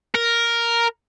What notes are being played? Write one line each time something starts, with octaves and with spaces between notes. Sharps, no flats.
A#4